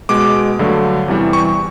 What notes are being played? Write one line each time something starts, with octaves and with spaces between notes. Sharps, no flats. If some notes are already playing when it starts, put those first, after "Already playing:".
B2 G#3 D6
G2 D3 F#3 A3
E2 C3 E3 G3
C#6